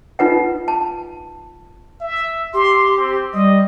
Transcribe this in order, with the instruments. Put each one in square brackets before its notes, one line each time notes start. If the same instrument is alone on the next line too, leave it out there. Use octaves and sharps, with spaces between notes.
[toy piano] D#4 F4 B4 F#5
A5
[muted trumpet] E5
[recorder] G4 [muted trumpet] C6
[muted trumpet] C4
[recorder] G3 [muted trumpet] D#5